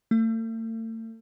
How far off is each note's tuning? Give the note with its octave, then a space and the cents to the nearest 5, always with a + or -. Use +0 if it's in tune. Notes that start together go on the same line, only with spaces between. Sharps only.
A3 +40